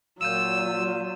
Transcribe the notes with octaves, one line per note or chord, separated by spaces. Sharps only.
A#2 F#3 F4 E6 G6 D#7 E7